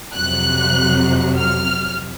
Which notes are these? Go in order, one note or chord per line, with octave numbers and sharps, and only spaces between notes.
F2 C3 F#3 F#6
F6